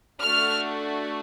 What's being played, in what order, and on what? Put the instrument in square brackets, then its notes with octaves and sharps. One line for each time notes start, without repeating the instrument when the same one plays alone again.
[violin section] A3 D4 F#4 F6